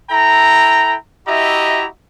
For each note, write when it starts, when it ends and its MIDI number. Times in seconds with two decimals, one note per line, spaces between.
0.11 0.95 64
0.11 0.95 69
0.11 0.95 79
0.11 0.95 82
1.27 1.87 64
1.27 1.87 66
1.27 1.87 67
1.27 1.87 75
1.27 1.87 76
1.27 1.87 82